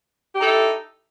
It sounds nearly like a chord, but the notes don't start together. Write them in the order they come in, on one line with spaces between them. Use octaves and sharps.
G4 D#4 A4 E4